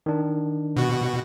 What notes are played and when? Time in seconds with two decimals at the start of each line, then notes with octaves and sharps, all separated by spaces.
0.06 D#3 D4
0.76 B2 F#4